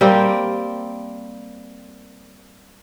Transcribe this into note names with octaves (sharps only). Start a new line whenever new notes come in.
G3 A#3 C4